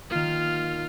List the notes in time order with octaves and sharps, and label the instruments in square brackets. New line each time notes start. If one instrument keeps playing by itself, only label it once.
[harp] D#3 A#3 [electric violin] F4 F6